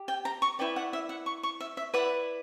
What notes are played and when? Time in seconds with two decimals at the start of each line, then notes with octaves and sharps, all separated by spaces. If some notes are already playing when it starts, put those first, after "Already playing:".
Already playing: G4
0.08 G5
0.25 A#5
0.42 C#6
0.59 E4 B4 D5 G5
0.76 F#5
0.93 E5
1.09 F#5
1.26 C#6
1.43 C#6
1.60 E5
1.77 E5
1.94 E4 B4 D5 F#5